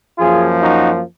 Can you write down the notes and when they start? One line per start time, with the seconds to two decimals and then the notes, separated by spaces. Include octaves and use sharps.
0.18 F#2 F3 A#3 F4 G#4
0.61 D#4 F#4